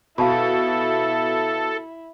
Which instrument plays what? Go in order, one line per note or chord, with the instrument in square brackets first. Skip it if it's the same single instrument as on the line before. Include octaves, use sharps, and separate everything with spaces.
[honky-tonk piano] B2 [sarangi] E4 [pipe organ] A4 [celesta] F5 A5 B5